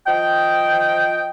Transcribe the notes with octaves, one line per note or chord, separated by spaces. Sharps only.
F3 D#5 G5